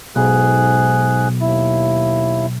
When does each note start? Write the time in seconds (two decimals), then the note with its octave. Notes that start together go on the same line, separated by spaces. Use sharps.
0.16 B1 G#2 G#4 F#6
1.41 D#2 E4